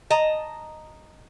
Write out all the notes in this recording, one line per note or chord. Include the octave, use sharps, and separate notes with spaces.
D#5 A5 A#5